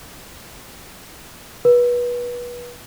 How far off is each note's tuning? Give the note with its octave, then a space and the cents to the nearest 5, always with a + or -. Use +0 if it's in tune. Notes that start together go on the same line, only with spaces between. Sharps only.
B4 -25